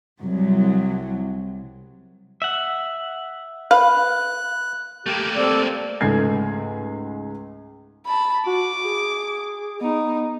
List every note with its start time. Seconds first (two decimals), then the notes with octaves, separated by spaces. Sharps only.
0.20 C2 F#3
2.42 E5 F#5
3.71 B4 F5 F#6
5.06 A3 A#3 G4
5.36 C4 A4 D5
6.01 C#2 G#2 A3 G#6 C7
8.06 A5 B5
8.47 F#4 D6
8.85 G#4
9.81 B3 D#4